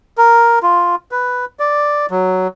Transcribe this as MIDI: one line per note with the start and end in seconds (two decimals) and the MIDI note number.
0.18 0.59 70
0.63 0.95 65
1.11 1.45 71
1.59 2.06 74
2.11 2.47 54